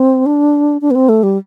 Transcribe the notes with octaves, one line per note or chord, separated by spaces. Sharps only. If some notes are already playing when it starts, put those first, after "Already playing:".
Already playing: C4
D4
D4
B3
C4
A3
G3